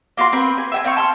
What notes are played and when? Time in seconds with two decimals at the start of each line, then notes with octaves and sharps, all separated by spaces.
0.17 A#3 F4 F#4 C6
0.32 C4 A#4 B4
0.58 G#5
0.72 E5 G5 G#5
0.85 C4 F5 G5 C#6
0.97 A5 C6 F6